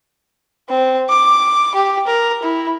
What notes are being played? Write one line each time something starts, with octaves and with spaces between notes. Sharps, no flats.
C4
D6
G4
A#4
E4